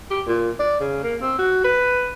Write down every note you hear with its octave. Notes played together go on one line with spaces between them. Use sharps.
G4
A#2
D5
C#3
A#3
C4
F#4
B4